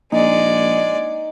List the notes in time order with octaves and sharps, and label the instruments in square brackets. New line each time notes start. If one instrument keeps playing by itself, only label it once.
[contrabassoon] A#1 [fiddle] G#3 D5 [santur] D#4